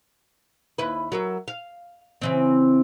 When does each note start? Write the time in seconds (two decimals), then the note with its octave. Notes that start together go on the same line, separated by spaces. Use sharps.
0.78 D#2 E4 B4
1.12 F#3 A#4 E5
1.48 F5
2.22 C#3 E3 C4